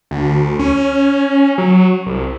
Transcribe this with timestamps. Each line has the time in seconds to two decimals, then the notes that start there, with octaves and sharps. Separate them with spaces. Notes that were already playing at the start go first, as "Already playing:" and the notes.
0.11 D2
0.59 C#4
1.58 F#3
2.07 C2